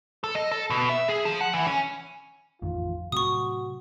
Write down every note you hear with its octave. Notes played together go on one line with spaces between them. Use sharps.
A4
D#5
A4
B2
E5
G#4
F3
F#5
E3
C#4
A1 F2 D#3 F4
A2 C3 F#3 F#4 C#6 D#6